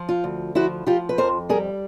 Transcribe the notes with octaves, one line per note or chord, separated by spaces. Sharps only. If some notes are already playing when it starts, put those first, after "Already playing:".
Already playing: F3
F4
D2
F3 E4 F#4
F3 F4 G4
B4
F2 A#4 C5
G3 G#4 A#4